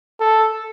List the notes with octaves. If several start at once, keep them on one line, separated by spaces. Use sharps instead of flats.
A4